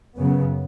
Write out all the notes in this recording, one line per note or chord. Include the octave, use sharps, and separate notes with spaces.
F#2 C#3 B3